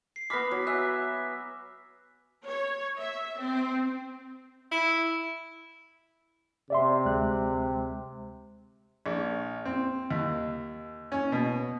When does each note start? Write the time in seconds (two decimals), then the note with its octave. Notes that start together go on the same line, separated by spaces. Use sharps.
0.16 C7
0.30 B3 B5 D6 F6 A#6
0.51 F#3
0.67 E5 G#5 E6 F#6
2.47 C#5
2.99 E5
3.39 C4
4.71 E4
6.70 C3 D5 E5 C6
7.05 D2 G#3 F#6
9.06 A#1
9.65 C4
10.11 D#2
11.12 C#4
11.32 B2